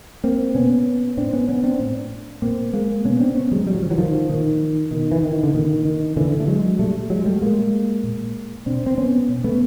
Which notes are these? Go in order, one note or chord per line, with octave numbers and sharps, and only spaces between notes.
A#3 C4
B2 B3 C#4
A2 C4 D4
B3 C#4
B3 C#4
C4 D4
A2
A#2 A#3 C4
G#3 A#3
B2 B3 C#4
C4 D4
B3 C#4
F#3 G#3
A2 G3
F#3
F3
E3 F#3
D#3 F3
A#2 D#3
B2 D#3
E3
D#3
D3
A#2 D#3
D#3
A#2 D3 E3
A3
F#3 G#3
A#2 G3 A3
F#3 G#3
G3 A3
A#2 G#3 A#3
A#2
B2 C4 D4
C4
B3 C#4
B2
A3 B3